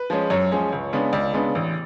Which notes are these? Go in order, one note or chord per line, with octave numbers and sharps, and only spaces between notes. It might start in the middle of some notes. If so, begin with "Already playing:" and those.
Already playing: B4
F3 G#3 C#4
F#2 C#5
F3 G#3 C#4
C#2
C#3 G#3 B3 D4
C#2 D5
C#3 G#3 B3 D4
A1